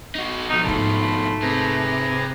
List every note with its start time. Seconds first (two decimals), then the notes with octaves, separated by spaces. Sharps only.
0.15 D#4 F#4
0.50 B2 F3 D#4 A4
0.65 G#2 A3 D#4 B5 C6
1.42 C3 G#4 B4 A#5